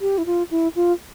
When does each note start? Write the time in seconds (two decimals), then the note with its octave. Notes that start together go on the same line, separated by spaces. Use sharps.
0.01 G4
0.18 E4
0.26 F4
0.51 E4
0.76 F4